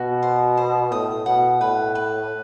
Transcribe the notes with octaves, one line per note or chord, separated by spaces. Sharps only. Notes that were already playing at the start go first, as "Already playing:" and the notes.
Already playing: B2 F#4
C5
C5
A2 D#6
B2 F#5
A2 B4
B4